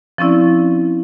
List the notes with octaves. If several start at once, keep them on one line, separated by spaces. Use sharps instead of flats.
F3 C4 C#4 E4 D5